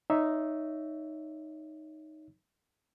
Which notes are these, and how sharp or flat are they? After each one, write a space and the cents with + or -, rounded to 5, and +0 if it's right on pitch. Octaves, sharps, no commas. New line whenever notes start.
D#4 +0 C#5 +25 E5 +0